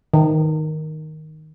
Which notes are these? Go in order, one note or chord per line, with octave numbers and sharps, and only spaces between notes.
D#3